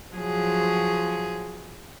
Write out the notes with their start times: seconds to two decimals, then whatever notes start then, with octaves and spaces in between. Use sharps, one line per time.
0.13 F3 F#3 G#4